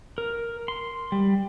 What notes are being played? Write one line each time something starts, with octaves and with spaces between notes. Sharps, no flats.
A#4
C6
G3